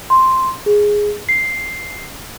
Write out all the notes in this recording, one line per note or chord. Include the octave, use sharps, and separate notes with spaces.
C6
G#4
C7